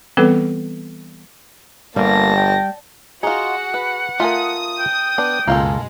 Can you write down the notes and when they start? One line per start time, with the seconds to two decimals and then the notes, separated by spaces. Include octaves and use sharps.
0.17 E3 G3 B3 C4 A4 B4
1.96 G1 G3 A#3 A5 A#6
2.36 G5
3.23 D#4 F4 F#4 G#4 F#5
3.74 B4
4.20 A3 F4 A#4 G#5 D#6
4.79 G5
5.18 B3 D4
5.47 C#2 F#2 B2 G#3 A#3 F4 A4